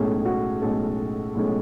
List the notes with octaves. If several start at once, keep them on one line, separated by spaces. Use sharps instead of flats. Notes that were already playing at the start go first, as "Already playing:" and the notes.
Already playing: B1 A2 G#3 C#4 G#4
F#4
B1 A2 G#3 C#4 A4
B1 A2 G#3 C#4